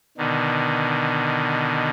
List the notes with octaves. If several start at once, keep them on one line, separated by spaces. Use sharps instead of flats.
B2 D3 D#3